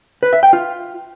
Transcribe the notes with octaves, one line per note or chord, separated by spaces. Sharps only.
B4
E5
G5
F4